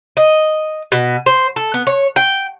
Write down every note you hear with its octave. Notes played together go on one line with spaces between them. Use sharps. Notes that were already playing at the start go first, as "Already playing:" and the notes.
D#5
B2
C5
A4
B3
C#5
G5